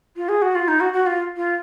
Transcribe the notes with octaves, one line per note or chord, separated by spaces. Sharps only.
F4
G#4
F#4
F4
D#4
F#4
F#4
F4
F4